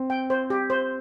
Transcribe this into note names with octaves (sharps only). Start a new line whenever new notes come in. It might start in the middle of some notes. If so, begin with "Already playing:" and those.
Already playing: C4
G5
C5
G4
C5